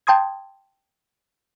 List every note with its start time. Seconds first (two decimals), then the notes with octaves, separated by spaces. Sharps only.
0.07 G5 A5 C6 D#6 G#6